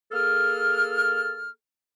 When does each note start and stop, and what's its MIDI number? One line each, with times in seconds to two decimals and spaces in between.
0.12 1.49 58
0.12 1.49 68
0.12 1.49 69
0.12 1.49 89